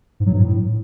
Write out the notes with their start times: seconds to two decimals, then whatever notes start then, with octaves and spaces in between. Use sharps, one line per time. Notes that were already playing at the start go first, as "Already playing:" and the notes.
0.20 G#2
0.26 F#3
0.33 G2
0.39 A2